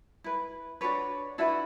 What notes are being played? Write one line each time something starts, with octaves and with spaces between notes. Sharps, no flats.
E4 B4
D4 F#4 B4 C#5
D4 E4 F#4 B4 E5